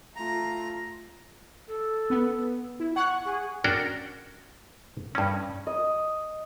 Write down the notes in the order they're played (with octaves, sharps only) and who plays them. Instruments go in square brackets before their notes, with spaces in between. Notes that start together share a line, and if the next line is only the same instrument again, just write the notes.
[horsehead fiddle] A3 F4 [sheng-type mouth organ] A#5
[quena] A4
[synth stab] B3
E4
[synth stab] F#5 F#6 [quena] C#6
[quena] G#4
[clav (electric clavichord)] C#4 D4 F#4 A#4 D5 G5
G2 C#4
[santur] D#5